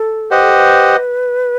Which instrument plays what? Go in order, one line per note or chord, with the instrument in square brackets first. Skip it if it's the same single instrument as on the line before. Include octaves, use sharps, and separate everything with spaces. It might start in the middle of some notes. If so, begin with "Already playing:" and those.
Already playing: [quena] A4
[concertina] G4 C5 D#5 F#5 [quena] B4
[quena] A4
B4